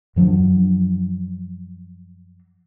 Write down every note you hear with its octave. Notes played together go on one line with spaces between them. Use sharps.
F#2 F3 F#3 D4